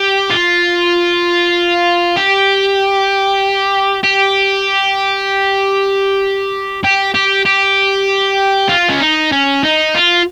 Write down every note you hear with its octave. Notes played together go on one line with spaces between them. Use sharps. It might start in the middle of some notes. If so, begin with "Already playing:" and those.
Already playing: G4
F4
G4
G4
G4
G4
G4
F4
C#4
D#4
C#4
D#4
F4